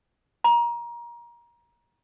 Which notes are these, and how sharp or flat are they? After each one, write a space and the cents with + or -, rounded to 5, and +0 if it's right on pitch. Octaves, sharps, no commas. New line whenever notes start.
A#5 +25